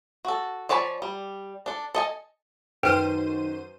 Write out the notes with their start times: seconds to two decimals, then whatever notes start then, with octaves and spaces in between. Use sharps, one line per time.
0.25 F#4 A4
0.69 F3 C#5 D5 G#5 B5
1.02 G3
1.66 D4 A4
1.95 A4 D#5 G#5
2.83 F#2 D#3 B4 C5 G5 F6 D#7